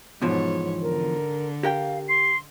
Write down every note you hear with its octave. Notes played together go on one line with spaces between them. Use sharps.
E2 G#2 B2 F3 C#5
D3 A#4
G4 A#4 F5 G5
C6 C7